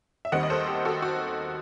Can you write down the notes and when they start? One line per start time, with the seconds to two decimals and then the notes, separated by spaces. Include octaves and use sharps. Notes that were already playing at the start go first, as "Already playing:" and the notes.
0.25 E5
0.32 D#2 D#3 G3 C4 D#5 F#5
0.43 D#5
0.50 A4 C5
0.67 G4
0.85 F#4 A4
1.02 F#4